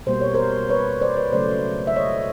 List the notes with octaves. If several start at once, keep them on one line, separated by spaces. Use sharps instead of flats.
B2 G3 A#3 C5
C#5
A#4 C5
B4 C#5
C5 D5
B4 C#5
C#3 F#3 A3 C5 D5
E5
C#5 D#5